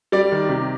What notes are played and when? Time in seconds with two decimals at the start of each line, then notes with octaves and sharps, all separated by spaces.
0.12 G3 D5
0.32 D#3
0.49 C3